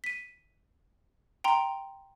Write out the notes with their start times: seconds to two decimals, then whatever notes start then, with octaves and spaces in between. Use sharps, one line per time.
0.04 B6 D#7
1.44 G5 A#5 C6